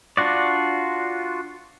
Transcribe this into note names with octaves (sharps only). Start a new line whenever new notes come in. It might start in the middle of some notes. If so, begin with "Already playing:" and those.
D4 F4 F#4 D5